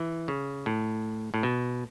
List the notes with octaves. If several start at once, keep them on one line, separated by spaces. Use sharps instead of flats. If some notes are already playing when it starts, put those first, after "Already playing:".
Already playing: E3
C#3
A2
A2
B2